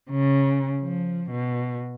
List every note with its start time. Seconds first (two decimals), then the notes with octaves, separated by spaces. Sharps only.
0.10 C#3
0.81 F3
1.30 B2